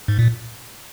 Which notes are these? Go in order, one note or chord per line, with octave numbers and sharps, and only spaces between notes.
G#2
A#2